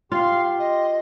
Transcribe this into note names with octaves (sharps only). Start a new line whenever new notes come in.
F4 G4 F5 C6
D#5